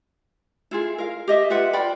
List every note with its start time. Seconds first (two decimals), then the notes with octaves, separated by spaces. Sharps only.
0.71 E4 F4 G#4
0.98 A#4 F5
1.28 G4 D#5 E5
1.50 F4 B4 E5 F#5
1.73 F4 D5 G5 B5